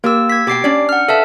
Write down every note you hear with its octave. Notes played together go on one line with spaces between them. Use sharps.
A#3 G4 A#4 E6
G#6 B6
B2 G4 G5 D6 C7
C#4 D4 D5
F#5 F6
A4 B4 E5 F5 A5